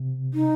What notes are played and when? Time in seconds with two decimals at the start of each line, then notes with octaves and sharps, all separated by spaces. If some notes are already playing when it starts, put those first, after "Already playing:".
Already playing: C3
0.34 D#4